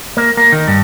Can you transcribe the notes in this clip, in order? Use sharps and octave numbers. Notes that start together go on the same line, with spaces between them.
A#3
A#3
D#3
G2